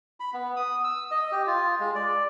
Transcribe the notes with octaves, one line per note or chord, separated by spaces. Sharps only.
B5
B3
D#6
E6
D#5
G4
F4
G#3
D5